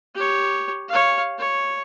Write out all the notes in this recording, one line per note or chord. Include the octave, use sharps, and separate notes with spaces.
G4 C#5
C#5 F5
C#5